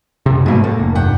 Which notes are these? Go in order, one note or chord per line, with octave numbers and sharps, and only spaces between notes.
F#2 C3
G#2 B2 A3 A#3
A2 A#3
F1
G2 F#5 G5